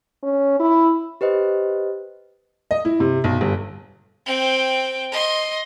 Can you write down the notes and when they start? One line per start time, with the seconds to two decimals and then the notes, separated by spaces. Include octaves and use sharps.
0.23 C#4
0.60 E4
1.21 G4 B4 C5 D#5
2.71 D#5
2.85 E4
3.00 C3
3.24 B1
3.41 G1
4.26 C4 G5
5.11 D#5 C6